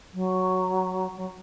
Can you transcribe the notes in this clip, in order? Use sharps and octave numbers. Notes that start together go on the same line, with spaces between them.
F#3
F#3